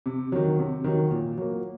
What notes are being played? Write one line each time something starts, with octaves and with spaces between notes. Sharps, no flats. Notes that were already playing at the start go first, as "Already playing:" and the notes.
C3
D#3 F#3
C3
D#3 F#3
A#2
F#3 A#3